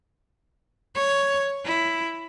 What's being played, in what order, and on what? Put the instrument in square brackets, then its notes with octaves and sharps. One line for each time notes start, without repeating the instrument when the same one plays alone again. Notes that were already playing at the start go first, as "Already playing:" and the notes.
[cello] C#5
E4